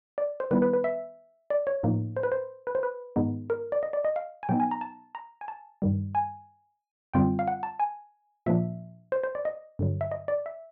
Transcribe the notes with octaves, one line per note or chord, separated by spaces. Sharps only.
D5
C5
D#3 G3 B3 E4 B4
B4
B4
E5
D5
C#5
A2 F3 A#3 D#4
C5
B4
C5
B4
C5
B4
G#2 D#3 G#3 B3 D#4
A#4
D5
D#5
D5
D#5
F5
G#5
B2 F#3 B3 D#4 G5
G#5
A#5
A5
A#5
G#5
A5
G2 D#3 G3
G#5
F#2 D3 G3 C4 F4 G5
F5
F#5
A5
G#5
A#2 F3 A#3 D4 E5
C5
C5
D5
D#5
G2 D3 F#3
E5
D#5
D5
E5